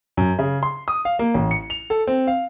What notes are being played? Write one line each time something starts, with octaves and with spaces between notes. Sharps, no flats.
F#2
C#3
C6
D#6
F5
A#3
A1
C#7
F7
A4
C4
F5